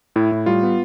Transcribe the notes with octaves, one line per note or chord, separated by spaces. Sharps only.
A2 E4
A2
G3 F4
B3